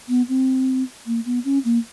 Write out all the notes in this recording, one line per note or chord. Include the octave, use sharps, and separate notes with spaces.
B3
C4
A#3
B3
C#4
A#3